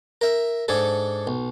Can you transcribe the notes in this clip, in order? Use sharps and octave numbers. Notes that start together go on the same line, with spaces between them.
A#4 E5
G#2 D4 G#4 A4
B1